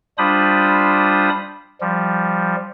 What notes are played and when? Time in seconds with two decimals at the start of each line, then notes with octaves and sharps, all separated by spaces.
0.18 G3 D4 F4 C5 B5 D#6
1.81 F3 G3